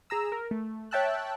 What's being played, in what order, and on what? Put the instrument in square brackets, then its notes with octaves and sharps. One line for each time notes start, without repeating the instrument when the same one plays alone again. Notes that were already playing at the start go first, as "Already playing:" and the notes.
[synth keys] G#4 A#5 E6
A#4
A3
C#5 E5 G5 A5 E6 F#6